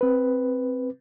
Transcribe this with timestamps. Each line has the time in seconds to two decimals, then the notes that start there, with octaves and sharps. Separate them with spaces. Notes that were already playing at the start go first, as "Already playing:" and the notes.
0.01 C4 B4